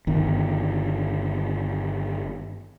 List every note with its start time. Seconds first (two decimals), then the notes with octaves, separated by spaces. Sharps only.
0.07 G1 D#3